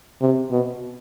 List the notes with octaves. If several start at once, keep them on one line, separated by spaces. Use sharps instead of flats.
C3
B2